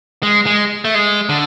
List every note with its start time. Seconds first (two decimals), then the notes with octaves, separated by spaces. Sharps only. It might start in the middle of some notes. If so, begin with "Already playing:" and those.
0.23 G#3
0.46 G#3
0.85 A3
0.95 G#3
1.29 D3